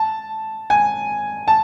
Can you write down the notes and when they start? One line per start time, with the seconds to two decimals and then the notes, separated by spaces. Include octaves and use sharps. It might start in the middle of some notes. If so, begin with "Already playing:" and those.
Already playing: A5
0.70 G#5
1.48 A5